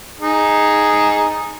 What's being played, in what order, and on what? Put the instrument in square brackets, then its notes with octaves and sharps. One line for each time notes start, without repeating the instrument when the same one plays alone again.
[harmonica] D#4 G#4